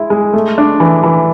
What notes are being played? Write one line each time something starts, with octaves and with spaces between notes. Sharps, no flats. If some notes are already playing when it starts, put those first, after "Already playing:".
Already playing: G#3 E4
G#3
A3
D4
E3
E3